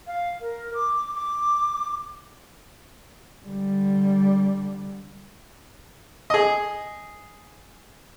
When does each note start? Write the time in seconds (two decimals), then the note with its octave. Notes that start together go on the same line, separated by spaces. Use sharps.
0.07 F5
0.41 A#4
0.74 D6
1.15 D6
3.46 D3 G3
6.30 G#4 D#5